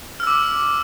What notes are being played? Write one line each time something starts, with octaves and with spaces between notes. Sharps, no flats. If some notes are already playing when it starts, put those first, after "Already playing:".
D6 E6 F6